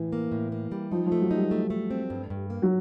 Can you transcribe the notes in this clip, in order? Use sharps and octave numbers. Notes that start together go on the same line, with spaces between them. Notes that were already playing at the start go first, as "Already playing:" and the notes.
Already playing: A2 E3
A#3
A2
A#3
G3
F3 D#4
F3
A3
F#3
D#4
G3
A3
A3
C4
G2
G2
A#3
F#3